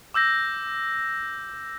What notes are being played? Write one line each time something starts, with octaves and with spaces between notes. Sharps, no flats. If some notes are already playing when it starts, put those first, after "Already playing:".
D6 E6 G6 A#6